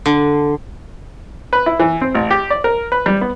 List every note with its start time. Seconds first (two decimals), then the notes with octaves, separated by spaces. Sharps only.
0.06 D3
1.53 B4
1.66 E4
1.80 E3
2.01 C4
2.15 A1
2.31 G4
2.50 D5
2.64 A#4
2.92 B4
3.06 G3
3.21 B3